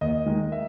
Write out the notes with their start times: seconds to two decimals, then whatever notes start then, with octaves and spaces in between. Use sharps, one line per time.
0.01 D#2 D#5
0.26 D#3 G#3
0.52 E5